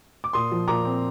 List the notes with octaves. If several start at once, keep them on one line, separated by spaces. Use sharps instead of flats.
D6
A#2 C6 D#6
F3
A#2 A#5 D6
C4